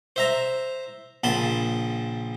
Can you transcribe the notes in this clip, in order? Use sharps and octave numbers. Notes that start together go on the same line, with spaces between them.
C5 E5 A#5
A#1 C#3 A5 B5 C6